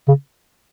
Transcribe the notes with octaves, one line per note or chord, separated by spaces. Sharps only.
C#3